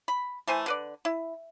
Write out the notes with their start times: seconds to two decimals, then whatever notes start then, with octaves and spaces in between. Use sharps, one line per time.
0.08 B5
0.48 E3 A3 C5 G#5
0.66 D3 B4 D5
1.05 E4